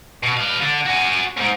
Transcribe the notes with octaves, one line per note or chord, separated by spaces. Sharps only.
B2
B4 F5
D3
F#4 G#5
E2 G#2